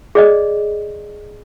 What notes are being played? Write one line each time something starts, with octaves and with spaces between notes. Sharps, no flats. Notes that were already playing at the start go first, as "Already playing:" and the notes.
G#4 D5 D#5